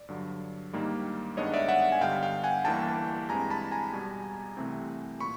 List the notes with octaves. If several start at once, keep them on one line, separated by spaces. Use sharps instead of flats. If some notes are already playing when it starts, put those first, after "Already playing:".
Already playing: D5
G2 D3 F#3
G#2 D#3 G3 A#3 D4
G2 D#3 G#3 B3 D4 C#5 D#5
D5 E5
E5 F#5
G#5
G2 D3 G3 B3 F5 G5
F5 G5
F#5 G#5
G1 G2 E3 G3 A#3 G5 A5
G2 E3 G#3 C4 G#5 A#5
A5 B5
G#5 A#5
E2 B2 G3
C2 C3 E3 A3 C4
A#2 B5 C#6